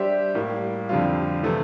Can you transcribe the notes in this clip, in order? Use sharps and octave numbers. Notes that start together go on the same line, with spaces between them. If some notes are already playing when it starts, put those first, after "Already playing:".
Already playing: G3 D4 G4 C5 E5
A2 G3 A#3
F2 D3 G3 C4 F4
C3 E3 A3 C4